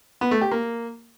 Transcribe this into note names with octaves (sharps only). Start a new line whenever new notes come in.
B3
A3
G4
A#3